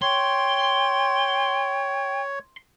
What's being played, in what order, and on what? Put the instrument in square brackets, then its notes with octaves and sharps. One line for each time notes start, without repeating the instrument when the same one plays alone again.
[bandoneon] C#5 [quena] G5 [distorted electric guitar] C6